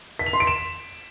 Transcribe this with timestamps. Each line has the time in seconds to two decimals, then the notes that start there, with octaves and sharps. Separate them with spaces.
0.19 B6
0.26 F7
0.33 C6
0.40 D7
0.47 E7